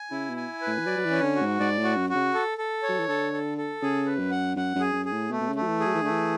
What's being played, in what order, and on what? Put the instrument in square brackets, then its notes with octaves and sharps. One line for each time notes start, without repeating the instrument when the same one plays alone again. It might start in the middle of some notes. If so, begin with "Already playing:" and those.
Already playing: [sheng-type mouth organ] G#5
[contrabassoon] C#3 [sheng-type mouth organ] E4
[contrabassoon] B2
[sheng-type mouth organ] G#5
B4
[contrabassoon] A2
E3
[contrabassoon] F#3 [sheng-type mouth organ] D5
[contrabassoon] F#3
E3
[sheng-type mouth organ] C#4
[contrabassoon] D3
[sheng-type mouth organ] F#4
[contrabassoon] G#2
[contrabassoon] G#2 [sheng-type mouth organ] D5
[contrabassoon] A2
[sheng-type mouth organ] F#4
[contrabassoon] F#2
[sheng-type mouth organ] F#4
[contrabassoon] C#3
[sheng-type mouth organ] A4
A4
C#5
[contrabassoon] F#3
E3
[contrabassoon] D3 [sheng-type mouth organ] A4
[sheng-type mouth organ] A4
A4
[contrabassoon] C#3 [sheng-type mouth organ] G#4
[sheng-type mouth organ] B4
[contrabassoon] F#2
[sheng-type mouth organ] F#5
[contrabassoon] F#2 [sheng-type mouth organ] F#5
[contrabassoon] F#2
[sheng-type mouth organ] G#4
[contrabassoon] F#2
[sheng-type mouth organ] G#4
[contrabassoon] A2
[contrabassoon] B2 [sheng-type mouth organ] A3
[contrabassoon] B2
C#3
[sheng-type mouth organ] A3
[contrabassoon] F#3
E3
[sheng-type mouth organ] G#4
[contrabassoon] F#3
E3
[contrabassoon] D3 [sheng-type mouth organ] A3
[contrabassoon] E3